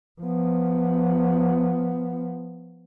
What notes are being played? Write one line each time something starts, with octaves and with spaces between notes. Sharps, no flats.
F3 B3